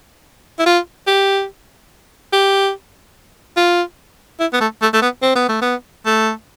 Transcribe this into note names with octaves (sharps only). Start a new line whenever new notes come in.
E4
F4
G4
G4
F4
E4
B3
A3
A3
A3
B3
C4
B3
A3
B3
A3